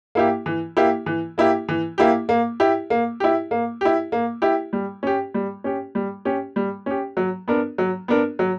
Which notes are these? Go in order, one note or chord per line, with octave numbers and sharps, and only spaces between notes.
A#3 E4 G4
E3
A#3 E4 G4
E3
A#3 E4 G4
E3
A#3 E4 G4
A#3
E4 G4
A#3
E4 G4
A#3
E4 G4
A#3
E4 G4
G3
C#4 G4
G3
C#4 G4
G3
C#4 G4
G3
C#4 G4
F#3
B3 D4 A#4
F#3
B3 D4 A#4
F#3